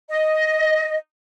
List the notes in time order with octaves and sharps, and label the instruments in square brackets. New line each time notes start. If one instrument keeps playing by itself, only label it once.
[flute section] D#5